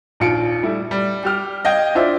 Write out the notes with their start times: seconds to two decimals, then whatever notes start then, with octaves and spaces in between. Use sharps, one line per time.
0.20 A#1 D#2 F4 C#7 D7
0.63 G3 A3 E4
0.91 G3
1.23 G3 G4 F6
1.65 D#5 F5 G5 G6 G#6
1.95 D4 E4 F4 C5 D5 E5